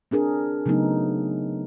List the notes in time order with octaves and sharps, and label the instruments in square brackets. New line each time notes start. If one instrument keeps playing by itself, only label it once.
[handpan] C4 D4 G#4 A#4
C#3 F#3 A3 B3 D#4